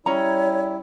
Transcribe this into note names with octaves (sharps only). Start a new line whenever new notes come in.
G3 C#4 E4 C#5 A#5